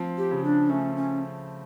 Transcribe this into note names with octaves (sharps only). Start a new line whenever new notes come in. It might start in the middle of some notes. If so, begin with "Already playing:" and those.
Already playing: F3 C4
G4
C#3
D4
A3 C#4
C#4